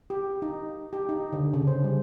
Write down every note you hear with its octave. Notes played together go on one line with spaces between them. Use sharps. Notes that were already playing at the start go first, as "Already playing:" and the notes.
G4
D#4
G4
D#4
D3
C#3
C5
G3